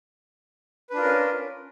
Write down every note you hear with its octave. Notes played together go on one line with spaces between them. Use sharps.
C#4 D4 F4 A#4 B4